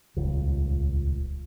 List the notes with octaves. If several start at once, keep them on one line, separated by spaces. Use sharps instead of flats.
D#1 C#2